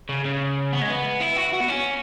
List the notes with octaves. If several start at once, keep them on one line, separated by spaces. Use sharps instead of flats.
C#3
C#3
B3
G#3
B3
E4
F#4
F#4
B3
C#4